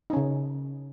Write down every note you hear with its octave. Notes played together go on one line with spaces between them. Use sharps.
C#3 C#4 D#4